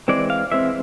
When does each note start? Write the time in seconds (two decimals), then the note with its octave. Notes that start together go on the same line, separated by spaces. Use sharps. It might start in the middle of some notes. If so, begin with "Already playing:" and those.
0.08 E3 G#3 C4 D5
0.30 F5
0.51 E3 G#3 C4 E5